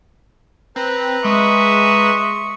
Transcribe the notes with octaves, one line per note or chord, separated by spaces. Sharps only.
C4 B4 A#5 F#6
G#3 E5 C6 C#6 D#6